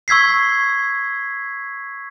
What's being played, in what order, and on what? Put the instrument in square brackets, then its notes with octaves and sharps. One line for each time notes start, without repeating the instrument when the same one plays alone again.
[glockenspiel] C#6 E6 G#6 B6 C7